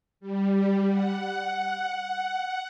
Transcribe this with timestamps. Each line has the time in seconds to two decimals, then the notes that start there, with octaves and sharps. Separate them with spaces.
0.20 G3
0.90 F#5